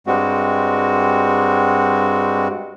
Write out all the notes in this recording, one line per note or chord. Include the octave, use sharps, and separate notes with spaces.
G2 G3 G#3 C4 F#4